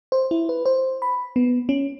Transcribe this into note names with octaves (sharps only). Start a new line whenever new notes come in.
C5
E4
B4
C5
B5
B3
C#4